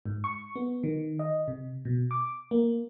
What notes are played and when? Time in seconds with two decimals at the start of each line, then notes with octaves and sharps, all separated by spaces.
0.06 G#2
0.24 C#6
0.55 B3
0.83 D#3
1.19 D#5
1.48 C3
1.85 B2
2.11 D6
2.51 A#3